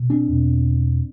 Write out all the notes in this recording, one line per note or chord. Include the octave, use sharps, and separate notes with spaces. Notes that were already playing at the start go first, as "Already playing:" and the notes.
Already playing: B2
C4 D4
E2 B2